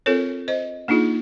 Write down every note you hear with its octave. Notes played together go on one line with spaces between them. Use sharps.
C4 F4 A4 A#4 C#5
C5 D#5
A#3 D4 D#4 F4 G#4